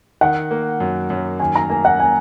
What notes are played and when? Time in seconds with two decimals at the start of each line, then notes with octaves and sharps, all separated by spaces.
0.21 D#3 F#5
0.51 A#3
0.80 F#2
1.10 F#2
1.40 D#3 G#5
1.56 A#5
1.70 A#3 G#5
1.85 F#5
2.00 G#5